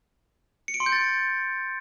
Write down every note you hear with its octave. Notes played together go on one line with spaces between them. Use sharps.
C#7
D7
C6
G6
A6